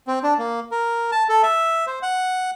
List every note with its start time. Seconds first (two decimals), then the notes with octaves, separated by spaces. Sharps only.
0.07 C4
0.23 D4
0.38 A#3
0.71 A#4
1.12 A5
1.29 A4
1.43 E5
1.87 C5
2.02 F#5